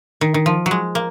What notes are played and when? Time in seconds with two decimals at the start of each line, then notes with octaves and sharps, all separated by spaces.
0.21 D#3
0.34 D#3
0.46 F3
0.66 F#3
0.71 G#3
0.95 A#3